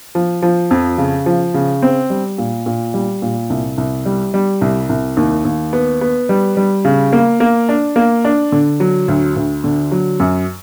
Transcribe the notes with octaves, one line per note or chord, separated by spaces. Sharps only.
F3
F3
F2
C#3
F3
C#3
C4
G3
A#2
A#2
G3
A#2
C2
C2
G3
G3
C2
C2
D#2
D#2
B3
B3
G3
G3
C#3
A#3
A#3
D4
A#3
D4
D3
F#3
D2
D2
D3
F#3
F#2